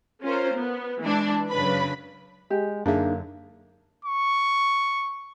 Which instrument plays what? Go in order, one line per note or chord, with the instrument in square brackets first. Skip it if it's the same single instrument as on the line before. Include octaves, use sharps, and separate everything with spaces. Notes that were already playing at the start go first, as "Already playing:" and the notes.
[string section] C#4 F4 A#4 C5
B3
E3 G#3 D4
F#2 C#3 D4 B4 B5
[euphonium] G#3 [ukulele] G4 G5
[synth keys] F#2 D3 [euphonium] A#3 [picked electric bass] D4 [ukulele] D#4 G#4 E5
[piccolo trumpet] C#6